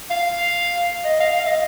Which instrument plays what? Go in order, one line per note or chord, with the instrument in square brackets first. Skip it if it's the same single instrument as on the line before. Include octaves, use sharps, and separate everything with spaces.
[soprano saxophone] F5
D#5
F5
F5
D#5